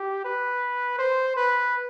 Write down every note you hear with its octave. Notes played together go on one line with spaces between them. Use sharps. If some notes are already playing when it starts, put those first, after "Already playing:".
Already playing: G4
B4
C5
B4